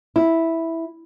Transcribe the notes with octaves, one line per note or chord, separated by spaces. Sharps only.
E4